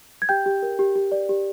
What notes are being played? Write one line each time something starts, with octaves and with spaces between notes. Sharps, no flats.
G#6
G4 G5 G6
G4
A#4
G4
G4
D5
G4